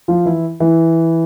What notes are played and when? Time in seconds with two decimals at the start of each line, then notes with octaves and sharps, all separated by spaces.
0.08 F3 F4
0.26 E3 E4
0.60 E3 E4